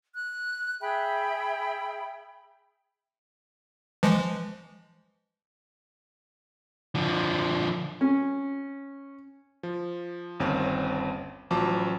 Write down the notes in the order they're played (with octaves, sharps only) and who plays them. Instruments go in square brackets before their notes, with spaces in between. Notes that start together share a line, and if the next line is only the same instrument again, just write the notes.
[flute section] F#6
G#4 E5 G5 B5
[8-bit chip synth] E3 F3 G#3
[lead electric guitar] D3 F3
[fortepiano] C#4
[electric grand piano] F3
G1 D#2 C4 C#4
A1 F3 F#3 A5 D6